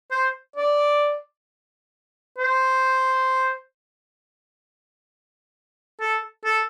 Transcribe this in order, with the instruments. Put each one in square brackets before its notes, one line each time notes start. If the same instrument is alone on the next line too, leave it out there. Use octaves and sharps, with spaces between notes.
[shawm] C5
D5
C5
A4
A4